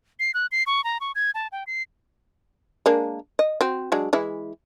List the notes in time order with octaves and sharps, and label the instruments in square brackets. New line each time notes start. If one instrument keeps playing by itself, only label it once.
[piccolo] C7
F#6
C7
C#6
A#5
C#6
G#6
A5
G5
C7
[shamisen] G#3 A#3 D4
D#5
C4 F#4
F#3 G#3 D4
E3 G#3 E4